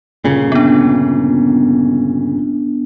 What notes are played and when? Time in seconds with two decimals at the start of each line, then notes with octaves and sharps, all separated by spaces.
0.24 G1 A#2 C#3
0.52 B3 D4